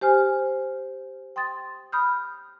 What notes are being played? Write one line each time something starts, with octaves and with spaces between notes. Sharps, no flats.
G4 C5 G#5 F6
G5 C6 D#6 A6
B5 D#6 F6 G6